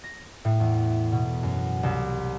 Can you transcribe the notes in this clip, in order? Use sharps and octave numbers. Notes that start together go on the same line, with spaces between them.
A#6
A2
E2
B2
F#2
C2